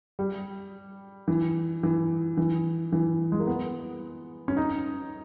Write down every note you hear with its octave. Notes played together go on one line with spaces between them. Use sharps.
G3
E3
E3
E3
E3
G#3
A#3
B3
C#4
D#4